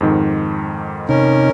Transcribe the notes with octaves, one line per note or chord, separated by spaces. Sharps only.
F2 G#2 D#3
C3 C#4 D#4 A#4